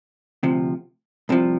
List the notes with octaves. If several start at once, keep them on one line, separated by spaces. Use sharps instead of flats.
D2 C3 F3
C2 C3 F3